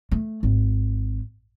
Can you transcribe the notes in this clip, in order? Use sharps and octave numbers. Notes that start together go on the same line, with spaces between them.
A3
G#1